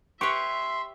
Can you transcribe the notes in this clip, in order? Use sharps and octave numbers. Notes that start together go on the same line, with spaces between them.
G4 B4 C#5 E5 C6 C#6